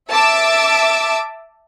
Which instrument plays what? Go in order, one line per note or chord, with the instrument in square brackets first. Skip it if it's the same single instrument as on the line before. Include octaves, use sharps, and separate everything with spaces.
[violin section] E5 A5 D6 E6